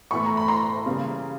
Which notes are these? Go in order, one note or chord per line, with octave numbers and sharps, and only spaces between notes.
A2 E3 A3 B5 C#6
A#5
B5
A#5 C6
C#3 E3 G3 A#3